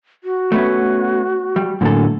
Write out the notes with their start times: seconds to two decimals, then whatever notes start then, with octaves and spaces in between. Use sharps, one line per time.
0.24 F#4
0.52 A3 B3 C#4
1.56 G3
1.81 F#2 A2 D3 A#3 A4 G#5